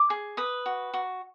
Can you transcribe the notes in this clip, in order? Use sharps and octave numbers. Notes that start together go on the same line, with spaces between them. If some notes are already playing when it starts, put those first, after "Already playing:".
Already playing: D6
G#4
B4 D#6
F#4
F#4